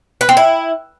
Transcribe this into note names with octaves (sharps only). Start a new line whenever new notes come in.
B4
C4
E4